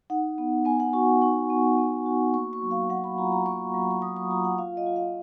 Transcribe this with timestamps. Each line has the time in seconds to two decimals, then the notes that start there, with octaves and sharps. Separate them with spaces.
0.10 D#4 F#5
0.38 B3
0.65 B3 G#5
0.80 F#5
0.93 F#4 C#6
1.22 D#4 C#6
1.50 B3
1.78 B3
2.06 F#4
2.34 A#3 C#6
2.53 C#6
2.62 F#3
2.71 F5
2.90 F#3 F#5
3.04 B5
3.18 F4 A#5
3.32 A#5
3.46 A#3 C#6
3.74 F#3
3.91 C#6
4.02 F#3 D#6
4.16 C#6
4.31 F4 A#5
4.44 F#5
4.58 F4 F5
4.77 D#5
4.86 F4
4.96 F5